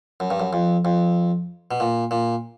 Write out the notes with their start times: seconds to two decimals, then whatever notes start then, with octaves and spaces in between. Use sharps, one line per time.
0.20 F#2
0.30 G2
0.40 F#2
0.53 F2
0.85 F2
1.71 B2
1.80 A#2
2.11 A#2